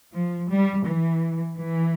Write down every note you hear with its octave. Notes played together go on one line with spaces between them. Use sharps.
F3
G3
E3
E3